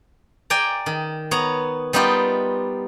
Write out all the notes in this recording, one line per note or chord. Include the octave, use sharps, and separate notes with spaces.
D5 G5 G#5 A#5
D#3
B3 C#5 A#5
G3 B3 D#4 F4 G4